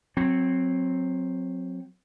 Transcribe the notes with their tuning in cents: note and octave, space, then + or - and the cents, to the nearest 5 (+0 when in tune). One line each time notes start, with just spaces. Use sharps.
F#3 -20 C4 +0